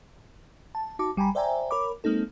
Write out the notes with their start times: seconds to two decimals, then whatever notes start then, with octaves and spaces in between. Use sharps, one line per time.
0.75 A5
0.99 D#4 F#4 A5 D6
1.16 G1 G3 G5 G#5 A#5 B5
1.35 C5 D5 E5 G5 G#5 A#5
1.71 A#4 C#5 B5 D6
2.04 G#3 A#3 C4 D#4 A4